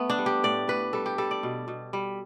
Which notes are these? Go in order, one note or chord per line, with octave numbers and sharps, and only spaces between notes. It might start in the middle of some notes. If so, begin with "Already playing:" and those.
Already playing: A3 B3
D4
G3
G4
A2 D5
A2 B4
G3 A4
G4
G3 A4
D5
B2
B2
G3